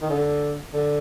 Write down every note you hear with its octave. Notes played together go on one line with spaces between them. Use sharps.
D#3
D3
D3